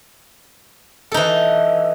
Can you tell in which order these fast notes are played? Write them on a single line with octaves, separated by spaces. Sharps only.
A4 D#4 E3